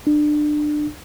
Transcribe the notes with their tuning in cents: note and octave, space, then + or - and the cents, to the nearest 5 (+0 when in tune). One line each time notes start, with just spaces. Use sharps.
D4 +25